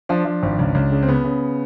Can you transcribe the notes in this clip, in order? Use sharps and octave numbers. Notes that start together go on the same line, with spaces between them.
F3 D4
F3
G#1
C#2
C#2
C#3
C4
C#3 B3
C#3